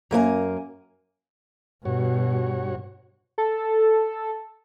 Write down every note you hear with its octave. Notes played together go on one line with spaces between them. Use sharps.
F#2 A#3 A#4 G#5
G2 B2 F#4 C#5
A4